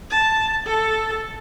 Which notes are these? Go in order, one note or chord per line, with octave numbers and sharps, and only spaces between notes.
A5
A4